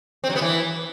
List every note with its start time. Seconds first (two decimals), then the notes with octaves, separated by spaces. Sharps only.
0.24 C4
0.30 F#3
0.36 B3
0.42 E3